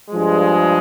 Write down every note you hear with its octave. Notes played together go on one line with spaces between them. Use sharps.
G2 F3 G#3